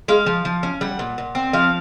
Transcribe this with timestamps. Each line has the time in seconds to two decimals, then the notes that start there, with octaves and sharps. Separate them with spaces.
0.08 G#3 F5
0.26 F3
0.45 F3
0.63 C#4
0.81 G3 F#5
0.99 A#2
1.18 A#2
1.35 C4
1.53 F3 F5